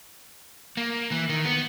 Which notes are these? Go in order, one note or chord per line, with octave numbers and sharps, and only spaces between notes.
A#3
E3
D#3
B3